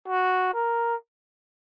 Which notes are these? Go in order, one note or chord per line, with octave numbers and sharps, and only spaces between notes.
F#4
A#4